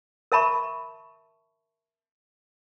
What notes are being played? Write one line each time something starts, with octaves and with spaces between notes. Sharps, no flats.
A#4 E5 A5 B5 C#6